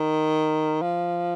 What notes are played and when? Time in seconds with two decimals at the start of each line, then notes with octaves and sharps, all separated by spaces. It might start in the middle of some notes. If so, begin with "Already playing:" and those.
Already playing: D#3
0.82 F3